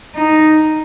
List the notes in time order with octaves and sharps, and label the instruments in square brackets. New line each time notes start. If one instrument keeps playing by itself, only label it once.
[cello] D#4